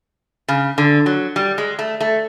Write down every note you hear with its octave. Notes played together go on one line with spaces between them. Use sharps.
C#3
D3
F#3
G3
G#3
A3
A3